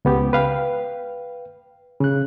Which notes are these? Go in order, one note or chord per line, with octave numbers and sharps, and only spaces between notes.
C#2 B3 G4
B4 F5 G5
C#3 F#6